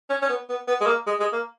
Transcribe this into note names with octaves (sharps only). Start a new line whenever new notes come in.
C#4
C#4
B3
B3
B3
G#3
A#3
G#3
G#3
A#3